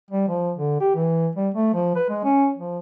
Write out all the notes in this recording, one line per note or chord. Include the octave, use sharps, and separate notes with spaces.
G3
F3
D3
G4
E3
G3
A3
F3
B4
G#3
C#4
F3